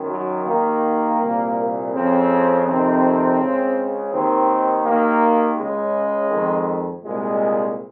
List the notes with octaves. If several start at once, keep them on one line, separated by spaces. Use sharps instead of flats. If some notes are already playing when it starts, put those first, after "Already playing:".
Already playing: F#2 D#3
F#3
D#2 D#3 A#3
C2 A#2
F2 C#3 C4
F2 C3 D#3 C4
C#2 C#3
D#2 D#3 C4
D#2 D#3 A#3
C#2 C#3 G#3
F2 D#3
C2 A#2 G#3